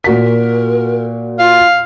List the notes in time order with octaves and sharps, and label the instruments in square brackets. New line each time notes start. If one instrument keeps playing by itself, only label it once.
[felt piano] A#2 F#4 B6 [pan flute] A#4
[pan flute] F4 [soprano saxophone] F5